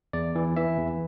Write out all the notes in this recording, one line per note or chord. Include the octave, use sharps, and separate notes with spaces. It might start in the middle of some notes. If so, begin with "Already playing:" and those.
E2 D5
E3
E3 E5
E2